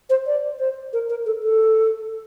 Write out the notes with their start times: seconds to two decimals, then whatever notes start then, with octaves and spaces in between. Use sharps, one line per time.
0.10 C5
0.26 D5
0.59 C5
0.93 A#4
1.10 A#4
1.26 A4
1.43 A4